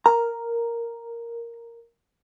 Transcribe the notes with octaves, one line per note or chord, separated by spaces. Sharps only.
A#4 A#5